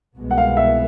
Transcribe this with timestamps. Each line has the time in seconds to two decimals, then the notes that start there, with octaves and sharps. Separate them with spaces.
0.18 C2 B2 G#3 B3
0.31 F#5
0.38 F5
0.57 E5